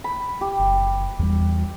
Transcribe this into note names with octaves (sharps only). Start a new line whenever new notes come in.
B5
G4
F#1
E2 G3